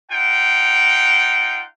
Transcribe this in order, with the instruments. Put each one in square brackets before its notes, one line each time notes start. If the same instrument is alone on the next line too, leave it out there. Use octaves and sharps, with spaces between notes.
[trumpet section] D#4 F4 F#5 G5